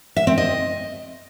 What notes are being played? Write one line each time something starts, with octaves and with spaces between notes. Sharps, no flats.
E5
C4
D#5